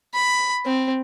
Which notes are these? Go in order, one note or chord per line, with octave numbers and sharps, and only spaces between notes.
B5
C4